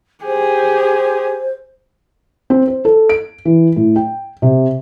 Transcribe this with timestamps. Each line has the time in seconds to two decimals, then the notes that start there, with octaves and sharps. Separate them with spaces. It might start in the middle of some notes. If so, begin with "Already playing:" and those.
0.25 G4 G#4 C5
2.50 C4
2.68 C5
2.85 A4
3.09 D7
3.45 E3
3.76 A2
3.96 G5
4.42 C3